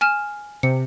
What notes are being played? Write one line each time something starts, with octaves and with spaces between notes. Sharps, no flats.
G#5 F6 E7
C3 C#7